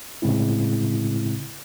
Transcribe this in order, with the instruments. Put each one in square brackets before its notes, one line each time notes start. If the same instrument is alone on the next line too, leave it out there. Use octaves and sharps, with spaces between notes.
[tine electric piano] A2 C#3 G#3 C4 E4